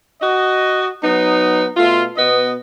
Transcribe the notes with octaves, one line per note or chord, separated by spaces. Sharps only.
F#4 D#5
F#3 B3 D#4
B2 A3 F4
B2 B3 D#5